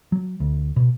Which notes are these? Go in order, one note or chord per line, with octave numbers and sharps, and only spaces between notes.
F#3
D2
B2